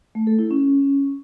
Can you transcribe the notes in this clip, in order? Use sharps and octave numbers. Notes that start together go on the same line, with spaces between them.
A3
A4
E4
C#4